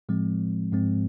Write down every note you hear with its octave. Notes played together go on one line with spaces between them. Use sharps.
A2 F3 G#3 C4
G#2 F3 G#3 C4